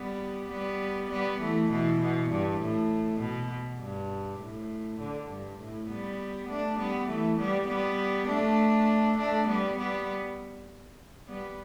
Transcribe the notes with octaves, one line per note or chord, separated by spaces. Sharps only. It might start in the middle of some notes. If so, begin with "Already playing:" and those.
Already playing: G3 B3
G3 B3
G3 B3
E3 A3
B2 E3
B2
G2
A2
B2
G2
A2
D3
G2
A2
G3 B3
A3 D4
G3 B3
E3 A3
G3 B3
G3 B3
A3 D4
A3 D4
G3 B3
G3 B3
G3 B3